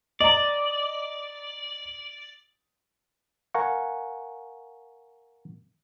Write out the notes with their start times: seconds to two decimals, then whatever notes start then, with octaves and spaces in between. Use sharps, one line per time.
0.21 D5 D#5 A#5
3.54 A#4 F5 F#5 G#5 A#5 C#6